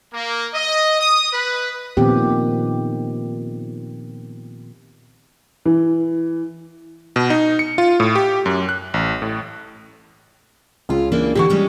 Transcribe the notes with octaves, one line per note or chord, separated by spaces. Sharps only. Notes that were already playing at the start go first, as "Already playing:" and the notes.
A#3
D#5
D#6
B4
A#2 D#3 F3 B3 C4 G4
E3
B2
D#4
C#7
F4
A2
G4
F#2
F#6
A1
A2
C#2 C#4 F4
E3 A#3 D4
D3 E3 F#4 G4 C#6
G3 G#3 C#4